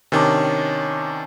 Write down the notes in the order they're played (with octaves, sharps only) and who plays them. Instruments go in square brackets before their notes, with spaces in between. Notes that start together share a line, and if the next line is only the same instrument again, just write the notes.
[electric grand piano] C3 D#3 [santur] C#4 D4